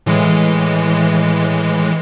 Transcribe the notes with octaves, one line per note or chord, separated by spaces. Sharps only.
A2 E3 G#3